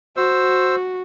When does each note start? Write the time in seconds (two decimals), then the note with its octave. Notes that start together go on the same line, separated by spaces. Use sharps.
0.17 F#4 C5 E6